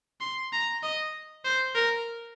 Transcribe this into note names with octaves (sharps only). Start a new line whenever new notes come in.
C6
A#5
D#5
C5
A#4